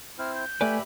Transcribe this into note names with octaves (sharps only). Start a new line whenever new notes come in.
C4 E4 C5 F6
G6
A3 G4 B4 D5 E5 G#5 B5